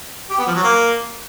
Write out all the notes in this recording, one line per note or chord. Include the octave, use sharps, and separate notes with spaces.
G4
B3
F3
F#3
A#3